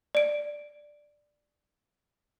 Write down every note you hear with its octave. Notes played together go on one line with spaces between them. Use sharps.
D5 D7